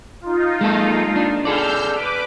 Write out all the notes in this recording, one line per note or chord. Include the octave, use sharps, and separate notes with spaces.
D#4 F4
G#3 A#3 A4
D4
G#4 A4 D5 E6 F6 G6
B4 D6